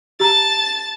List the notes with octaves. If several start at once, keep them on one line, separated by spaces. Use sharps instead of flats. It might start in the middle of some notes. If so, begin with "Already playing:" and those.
G4 A5 A#5 A6